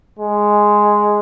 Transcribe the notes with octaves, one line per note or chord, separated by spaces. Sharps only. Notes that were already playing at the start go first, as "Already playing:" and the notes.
G#3